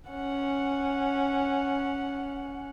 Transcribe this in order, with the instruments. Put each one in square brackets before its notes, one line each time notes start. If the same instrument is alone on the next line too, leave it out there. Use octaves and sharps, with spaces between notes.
[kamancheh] C#4 F#5